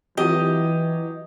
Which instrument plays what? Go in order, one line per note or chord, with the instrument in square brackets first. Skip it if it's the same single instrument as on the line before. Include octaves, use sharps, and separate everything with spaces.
[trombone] E3 [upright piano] F#3 G4 [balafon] C4 F4 [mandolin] D#5